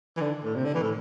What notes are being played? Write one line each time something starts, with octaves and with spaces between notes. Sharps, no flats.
E3
D3
A2
C3
D3
E3
A2